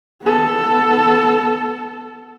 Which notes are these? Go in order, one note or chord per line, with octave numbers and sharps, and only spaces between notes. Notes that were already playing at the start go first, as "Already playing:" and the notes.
B3 A4